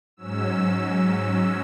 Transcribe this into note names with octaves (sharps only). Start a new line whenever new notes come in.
G#2 F#3 C#4 E6
E6